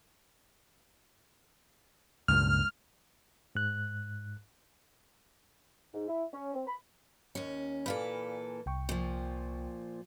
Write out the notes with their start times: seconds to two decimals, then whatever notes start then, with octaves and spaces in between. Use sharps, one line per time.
2.28 C#2 G2 A#2 F6
3.55 G#2 F#6
5.93 G#2
6.07 E4
6.32 C#4
6.54 C4
6.67 B5
7.35 D#2 C#4
7.86 A#2 E3 A4 D5 F5 B5
8.66 C2 G5 C#6
8.89 A#2 F3